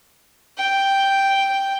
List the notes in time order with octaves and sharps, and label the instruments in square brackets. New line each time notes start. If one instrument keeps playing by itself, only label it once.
[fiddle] G5